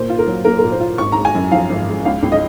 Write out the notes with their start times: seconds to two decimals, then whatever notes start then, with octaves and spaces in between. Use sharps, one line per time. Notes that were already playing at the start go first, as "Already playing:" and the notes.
Already playing: A#2 A#3 C5
0.10 F4
0.19 A#4
0.27 F#3
0.45 A#3 A#4
0.59 A#2 A#4
0.72 C5
0.80 F4
0.98 G#1 C#6
1.12 G#3 A#5
1.25 G#5
1.35 F#2
1.51 F3 F5
1.70 G#1
1.88 G#3
2.05 C#2 F5
2.23 C#2
2.32 D#5